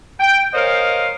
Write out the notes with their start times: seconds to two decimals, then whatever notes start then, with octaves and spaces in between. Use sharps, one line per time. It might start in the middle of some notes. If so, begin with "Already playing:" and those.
0.20 G5
0.54 A#4 C5 C#5 D#5 F5